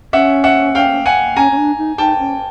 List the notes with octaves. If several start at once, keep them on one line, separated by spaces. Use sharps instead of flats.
C#4 E5 F#5
E5 F#5
F5 G5
F#5 G#5
C#4 G#5 A#5
C#4
D4
D#4
D#4 G5 A5
C#4